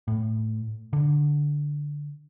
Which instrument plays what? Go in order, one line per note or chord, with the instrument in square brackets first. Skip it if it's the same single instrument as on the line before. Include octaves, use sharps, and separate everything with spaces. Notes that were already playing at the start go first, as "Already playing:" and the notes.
[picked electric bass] A2
D3